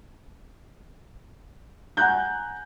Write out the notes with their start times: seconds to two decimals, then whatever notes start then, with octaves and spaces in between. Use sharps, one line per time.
1.97 F#5 G#5 A#5 F#6 G6